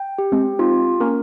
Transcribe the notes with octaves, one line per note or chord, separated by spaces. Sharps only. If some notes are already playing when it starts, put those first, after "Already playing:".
Already playing: G5
G4
G#3 C4
C4 D#4 F4
A#3 C#4 A#4